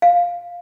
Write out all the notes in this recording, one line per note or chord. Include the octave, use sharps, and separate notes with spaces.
F5